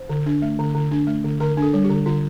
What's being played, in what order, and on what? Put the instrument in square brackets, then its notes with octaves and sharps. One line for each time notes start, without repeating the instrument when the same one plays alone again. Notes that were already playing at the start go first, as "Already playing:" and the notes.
Already playing: [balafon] C5
D3
D4
A3
D3
D3
D4
A3
D3
D3 A#4
D4
A4
G3
G4
D3
D3 F4